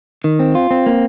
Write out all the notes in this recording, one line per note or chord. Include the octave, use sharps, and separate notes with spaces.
D#3
C4
F4
C4
A#3